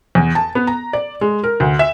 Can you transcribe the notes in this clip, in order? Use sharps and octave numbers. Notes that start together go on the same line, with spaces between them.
E2
A5
B3
A#5
D5
G#3
A#4
D2
E5